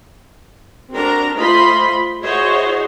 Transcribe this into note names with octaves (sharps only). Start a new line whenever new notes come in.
C4 D4 F#4 A#4 A#5
A3 F4 C5 D#5 B5 C6
E4 F#4 G#4 C5 C#5 D#5